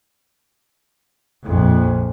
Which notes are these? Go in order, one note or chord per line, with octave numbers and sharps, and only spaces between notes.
A#1 F2